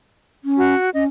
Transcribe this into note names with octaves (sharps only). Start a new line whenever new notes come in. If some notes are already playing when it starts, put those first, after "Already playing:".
C#4
F#4
C#4 D#5